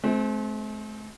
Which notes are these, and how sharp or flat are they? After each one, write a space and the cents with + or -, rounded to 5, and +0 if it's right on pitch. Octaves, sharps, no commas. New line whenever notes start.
A3 -45 C4 -5